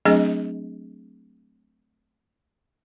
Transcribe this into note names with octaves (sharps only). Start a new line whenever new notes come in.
F#3 A3 C4 D4 G#4 D#5